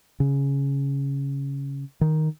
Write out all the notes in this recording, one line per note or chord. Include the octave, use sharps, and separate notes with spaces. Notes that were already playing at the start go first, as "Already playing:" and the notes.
C#3
D#3